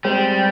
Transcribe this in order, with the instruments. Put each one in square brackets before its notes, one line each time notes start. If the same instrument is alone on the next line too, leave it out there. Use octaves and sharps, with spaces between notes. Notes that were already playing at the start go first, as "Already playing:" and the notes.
[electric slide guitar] G3 [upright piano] G#3 C4 G4 C5